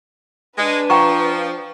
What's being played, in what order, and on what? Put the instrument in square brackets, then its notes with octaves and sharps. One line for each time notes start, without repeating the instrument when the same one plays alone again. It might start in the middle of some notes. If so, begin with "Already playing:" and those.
[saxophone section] G#3 [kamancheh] D4 B4
[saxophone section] F3 [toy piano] G5 A#5 C#6